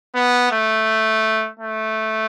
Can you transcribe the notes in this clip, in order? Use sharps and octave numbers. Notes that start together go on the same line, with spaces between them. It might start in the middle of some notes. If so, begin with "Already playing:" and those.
B3
A3
A3